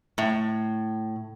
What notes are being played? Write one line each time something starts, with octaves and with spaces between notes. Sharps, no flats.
A2